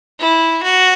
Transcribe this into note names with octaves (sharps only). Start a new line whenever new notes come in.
E4
F#4